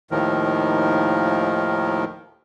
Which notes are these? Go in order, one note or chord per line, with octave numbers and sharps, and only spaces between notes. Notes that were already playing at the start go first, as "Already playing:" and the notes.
D#2 A2 D#3 F3 A#4